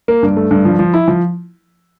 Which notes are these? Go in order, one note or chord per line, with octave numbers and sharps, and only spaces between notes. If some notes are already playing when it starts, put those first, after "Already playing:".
A#3
G2
A3
G2
F3
F3
E4
F3